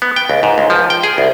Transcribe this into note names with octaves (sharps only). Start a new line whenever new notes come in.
B3
G5
C#2
G#2
C#2
F3
G5
G#4
C2